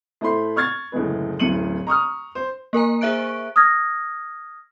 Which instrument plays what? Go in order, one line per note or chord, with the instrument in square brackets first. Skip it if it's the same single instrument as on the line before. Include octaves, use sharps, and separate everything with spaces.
[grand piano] A2 A3 C5 B5 C6
C#6 F6 G#6 A6
F#1 A2 D3 G#3 B4
D1 F#2 A2 C#7 D#7 F#7
A#5 C#6 D#6 F6
C5
[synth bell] A#3 A#4 G#5 A#5
G#4 C5 E5 C#6 F#6 D7
[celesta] D#6 F6 G#6 A#6